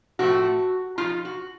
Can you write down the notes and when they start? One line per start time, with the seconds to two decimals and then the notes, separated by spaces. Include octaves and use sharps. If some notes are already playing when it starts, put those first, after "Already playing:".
0.19 A2 F3 A3 C4 F#4
0.98 F3 A3 D#4 F4
1.25 F#4